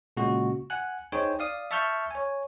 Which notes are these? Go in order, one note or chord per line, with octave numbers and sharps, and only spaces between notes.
A#2 C#3 G#3 F#4
F#5 G#5 F#6
D#4 G#4 C5 C#5 G5 G#5
D5 F5 D#6
E5 A5 C#6 F6 G6
C#5 G#5